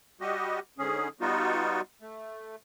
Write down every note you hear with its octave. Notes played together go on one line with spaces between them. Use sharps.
G3 F#4 G4 D#5
G#2 D3 C#4 G#4
G3 B3 D#4 F4 F#4
A3